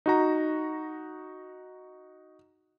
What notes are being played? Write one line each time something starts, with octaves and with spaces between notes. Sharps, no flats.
D#4 F#4 A#5